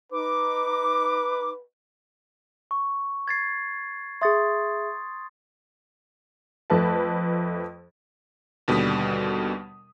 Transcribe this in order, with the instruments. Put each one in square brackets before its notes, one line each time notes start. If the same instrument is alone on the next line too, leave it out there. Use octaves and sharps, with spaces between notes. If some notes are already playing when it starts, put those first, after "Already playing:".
[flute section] D#4 D6 [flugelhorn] B4
[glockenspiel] C#6
G#6 A6 C7
[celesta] G#4 E5 [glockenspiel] C6 D#6 A6
[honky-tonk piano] F2 A3 B4 A5
[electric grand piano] D#2 B2 D3 G3 D#6 B6